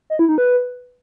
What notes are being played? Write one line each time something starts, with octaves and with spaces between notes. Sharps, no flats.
D#5
E4
D#4
B4